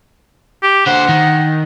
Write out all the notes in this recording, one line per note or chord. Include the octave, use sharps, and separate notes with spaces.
G4
D3 C5 F#5
D#3